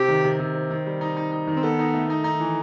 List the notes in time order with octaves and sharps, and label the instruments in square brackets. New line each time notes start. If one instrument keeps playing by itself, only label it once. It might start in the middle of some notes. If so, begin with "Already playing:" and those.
Already playing: [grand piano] C3 C4 [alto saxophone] G4
[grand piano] D#3
C3
C3
C4
D#3
G3
D#4
D#4
D#4
D#3
[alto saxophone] C4
[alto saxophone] B3 [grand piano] A4
[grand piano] D#4
A3
D#4
D#4
E3